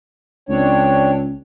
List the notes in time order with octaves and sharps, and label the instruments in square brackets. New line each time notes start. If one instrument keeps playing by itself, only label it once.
[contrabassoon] C#2 [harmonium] C4 D4 C#5